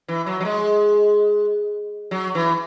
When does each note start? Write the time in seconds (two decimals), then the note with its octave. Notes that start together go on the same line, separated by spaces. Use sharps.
0.08 E3
0.26 F#3
0.40 F#3
0.45 G#3
2.11 F#3
2.35 E3